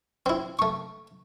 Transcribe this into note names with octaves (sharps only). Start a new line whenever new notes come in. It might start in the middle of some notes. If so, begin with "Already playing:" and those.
C4 E4
A3 C#6